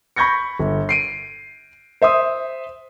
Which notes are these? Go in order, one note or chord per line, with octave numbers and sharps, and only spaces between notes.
B5 C#6 G6 G#6 A#6 C#7
G1
C7 D7 D#7
C5 E5 C6 D#6